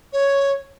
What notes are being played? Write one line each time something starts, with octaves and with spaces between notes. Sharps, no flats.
C#5